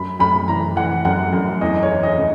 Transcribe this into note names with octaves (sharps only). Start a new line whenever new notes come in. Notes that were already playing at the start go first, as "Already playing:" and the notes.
Already playing: F#2 B5
F#2 B5
E3 A#5
E3 F#5
F#2 F#5
F#2
E2 D#5
C#5
E3
D#5
C#3